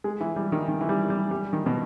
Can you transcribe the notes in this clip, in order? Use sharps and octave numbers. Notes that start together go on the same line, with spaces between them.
G#3
E3
G3
D#3
D#3
E3
G3
G3
G3
D#3
B2